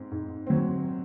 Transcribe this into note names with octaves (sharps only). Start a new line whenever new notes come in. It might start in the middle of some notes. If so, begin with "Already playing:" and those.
Already playing: G#2 C4
G#2
F#3 C4